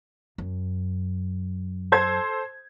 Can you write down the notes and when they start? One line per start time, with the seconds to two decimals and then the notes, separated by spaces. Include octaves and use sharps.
0.38 F#2
1.92 A4 C5 G#6